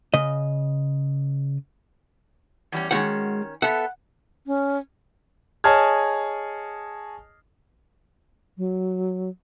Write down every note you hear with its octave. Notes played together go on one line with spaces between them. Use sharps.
C#3 D#5
E2 G3 C#4
D#3 G#3 C#4 F#4 F#5
B3 A4 E5 F#5
C#4
G#4 C#5 D#5 A5 F6 G#6
F#3